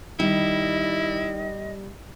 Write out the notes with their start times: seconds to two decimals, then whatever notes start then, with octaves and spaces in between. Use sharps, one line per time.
0.20 D#3 G3 E4 D#5